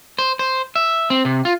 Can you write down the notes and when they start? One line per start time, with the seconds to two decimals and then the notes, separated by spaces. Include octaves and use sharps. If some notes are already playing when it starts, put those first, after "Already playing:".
0.19 C5
0.39 C5
0.76 E5
1.10 C4
1.25 C3
1.45 F4